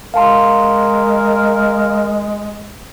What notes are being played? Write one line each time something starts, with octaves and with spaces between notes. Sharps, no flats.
G#3 A#4 F5 A5 C6